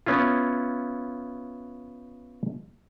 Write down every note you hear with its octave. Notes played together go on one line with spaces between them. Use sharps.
B3 C#4 E4 F4